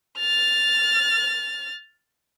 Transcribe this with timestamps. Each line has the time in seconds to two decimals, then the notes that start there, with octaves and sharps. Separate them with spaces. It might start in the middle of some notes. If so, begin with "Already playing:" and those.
0.19 F6 A6